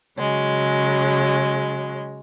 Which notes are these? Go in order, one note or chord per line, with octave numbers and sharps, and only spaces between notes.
C#3 F#3 G#3